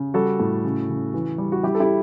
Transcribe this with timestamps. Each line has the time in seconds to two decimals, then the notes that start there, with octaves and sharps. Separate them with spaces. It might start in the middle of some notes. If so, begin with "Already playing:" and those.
Already playing: C#3
0.14 G3 F#4 A4
0.40 A2
0.64 C#3
0.89 C#3
1.14 E3
1.38 G3
1.52 F#4
1.63 G3 E4 G4
1.75 A4
1.80 E4 G4